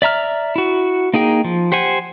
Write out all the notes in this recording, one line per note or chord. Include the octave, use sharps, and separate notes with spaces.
D5 E5 A#5 F6
E4 F#4
A#3 D#4 G#4 G5
F3
G4 C5 F#5 G#5